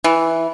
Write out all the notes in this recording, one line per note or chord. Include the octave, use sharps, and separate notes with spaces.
E3